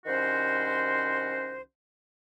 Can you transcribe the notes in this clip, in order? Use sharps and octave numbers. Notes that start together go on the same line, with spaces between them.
C2 D#3 C#4 F#4 C5